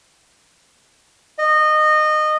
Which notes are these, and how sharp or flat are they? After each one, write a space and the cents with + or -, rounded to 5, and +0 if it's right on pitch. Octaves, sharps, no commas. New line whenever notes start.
D#5 -20